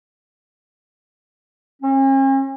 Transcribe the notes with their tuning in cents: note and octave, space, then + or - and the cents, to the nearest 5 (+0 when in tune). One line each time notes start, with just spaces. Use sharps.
C#4 -45